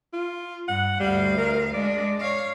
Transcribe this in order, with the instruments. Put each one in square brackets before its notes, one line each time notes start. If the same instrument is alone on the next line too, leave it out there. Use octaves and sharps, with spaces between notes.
[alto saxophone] F4
[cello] G2 [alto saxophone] F#5
[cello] D2 F5 [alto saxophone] G3
[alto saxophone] A#4
[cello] G#3 D4 [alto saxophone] D5
[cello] C#5 F5